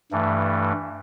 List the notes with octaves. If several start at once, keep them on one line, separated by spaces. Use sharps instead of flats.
G2 E3 A3